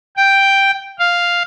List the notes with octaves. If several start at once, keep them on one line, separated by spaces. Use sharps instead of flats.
G5
F5